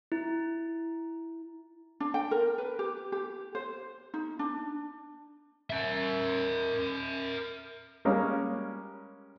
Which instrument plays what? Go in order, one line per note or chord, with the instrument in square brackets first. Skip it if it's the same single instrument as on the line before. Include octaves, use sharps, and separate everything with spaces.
[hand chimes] E4
[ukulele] D4
G5
A#4
B4
G4
G4
C5
D#4
D4
[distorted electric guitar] A#4 E5
[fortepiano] G3 G#3 A#3 C#4